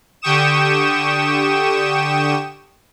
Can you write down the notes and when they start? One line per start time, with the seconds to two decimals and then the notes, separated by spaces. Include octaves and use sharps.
0.22 D3 G4 G5 C#6 D#6 E7